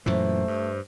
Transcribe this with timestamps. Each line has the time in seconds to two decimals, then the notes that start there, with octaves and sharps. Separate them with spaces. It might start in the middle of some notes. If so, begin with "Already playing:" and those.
0.06 F#2 A#2 E3 A3 C5
0.48 G2